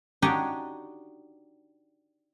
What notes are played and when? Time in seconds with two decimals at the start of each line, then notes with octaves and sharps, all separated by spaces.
0.22 D4 D#4 F#4 G4 C#5 D#5